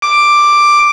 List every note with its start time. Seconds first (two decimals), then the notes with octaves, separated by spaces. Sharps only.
0.02 D6